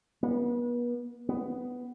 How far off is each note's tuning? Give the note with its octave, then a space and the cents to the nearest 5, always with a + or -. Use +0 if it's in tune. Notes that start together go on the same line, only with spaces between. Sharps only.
B3 -40
B3 +10